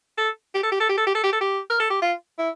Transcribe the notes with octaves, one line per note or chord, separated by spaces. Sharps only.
A4
G4
A4
G4
A4
G4
A4
G4
A4
G4
A4
G4
A#4
A4
G4
F4
E4